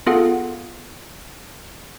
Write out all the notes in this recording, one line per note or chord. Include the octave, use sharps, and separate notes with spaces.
B3 F4 G#4 A4 F5 F#5